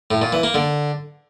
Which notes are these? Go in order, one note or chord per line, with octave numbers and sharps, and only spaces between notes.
A2
A#2
E3
A#3
D3